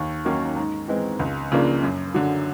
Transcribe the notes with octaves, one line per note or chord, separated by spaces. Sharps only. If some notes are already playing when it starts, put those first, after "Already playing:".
Already playing: D#2
D#3 F#3 A#3 C#4
G#2
E3 G#3 C4
C#2
C#3 F3 A#3 D4
F#2
D3 F#3